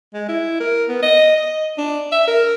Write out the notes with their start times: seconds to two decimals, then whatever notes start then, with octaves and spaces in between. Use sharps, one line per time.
0.13 G#3
0.28 E4
0.60 A#4
0.89 B3
1.02 D#5
1.36 D#5
1.78 D4
2.12 E5
2.27 A#4